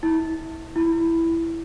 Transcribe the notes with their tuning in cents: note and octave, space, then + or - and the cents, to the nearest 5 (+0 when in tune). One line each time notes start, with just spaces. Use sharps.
E4 -30
E4 +5